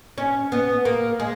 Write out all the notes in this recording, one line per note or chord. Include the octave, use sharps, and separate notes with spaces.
C#4
B3
A#3
G#3